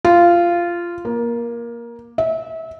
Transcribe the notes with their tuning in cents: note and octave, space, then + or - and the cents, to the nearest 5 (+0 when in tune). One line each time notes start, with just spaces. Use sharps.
F4 -15
A#3 +15
E5 -30